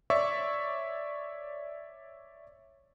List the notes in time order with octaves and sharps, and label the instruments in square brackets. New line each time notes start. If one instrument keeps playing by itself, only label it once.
[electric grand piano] C#5 D5 E5 C#6